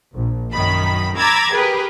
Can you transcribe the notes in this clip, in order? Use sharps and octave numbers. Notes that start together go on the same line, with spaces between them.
A#1
F#2 D#3 B5
A#5 B5 D6 E6 G#6 A6
G4 G#4 A#4 B4